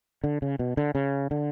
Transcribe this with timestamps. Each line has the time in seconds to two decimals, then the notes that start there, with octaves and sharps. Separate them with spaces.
0.24 D3
0.42 C#3
0.59 B2
0.77 D3
0.95 C#3
1.31 D3